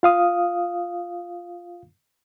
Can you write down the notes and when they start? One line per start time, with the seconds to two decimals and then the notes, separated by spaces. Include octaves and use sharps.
0.03 F4 F5 D#6